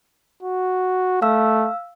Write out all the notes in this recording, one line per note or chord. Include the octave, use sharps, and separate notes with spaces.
F#4
A3 F5 E6